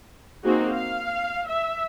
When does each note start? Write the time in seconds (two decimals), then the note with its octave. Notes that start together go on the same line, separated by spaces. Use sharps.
0.43 A#3 C4 D#4 F#4 G#4
0.72 F5
1.48 E5